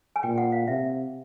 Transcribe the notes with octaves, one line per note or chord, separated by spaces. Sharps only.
G#5
A#2 G5
F#5
F5
C3 E5